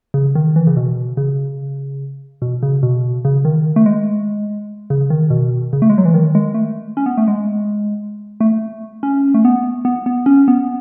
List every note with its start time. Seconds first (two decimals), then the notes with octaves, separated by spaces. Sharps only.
0.14 C#3
0.35 D#3
0.56 E3
0.67 C#3
0.77 B2
1.17 C#3
2.42 B2
2.63 C#3
2.83 B2
3.25 C#3
3.45 D#3
3.76 A3
3.86 G#3
4.90 C#3
5.10 D#3
5.30 B2
5.73 C#3
5.82 A3
5.90 G#3
5.98 F#3
6.05 E3
6.14 D#3
6.35 G#3
6.54 A3
6.97 C#4
7.06 B3
7.17 A3
7.28 G#3
8.40 A3
9.03 C#4
9.34 A3
9.45 B3
9.85 B3
10.06 B3
10.26 C#4
10.48 B3